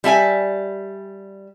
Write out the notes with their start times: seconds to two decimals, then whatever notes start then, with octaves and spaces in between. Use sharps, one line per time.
0.04 G3 E5 G5 G#5